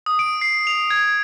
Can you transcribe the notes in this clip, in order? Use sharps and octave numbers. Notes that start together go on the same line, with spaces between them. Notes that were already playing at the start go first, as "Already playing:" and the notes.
D#6
D7
C7
F7
G#6